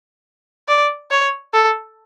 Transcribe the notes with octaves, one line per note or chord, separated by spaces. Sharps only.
D5
C#5
A4